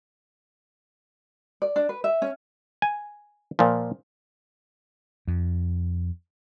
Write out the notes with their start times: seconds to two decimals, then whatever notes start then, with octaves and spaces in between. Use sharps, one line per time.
1.62 D5
1.76 D4
1.89 B4
2.04 E5
2.22 C#4
2.82 G#5
3.59 A#2 F3
5.27 F2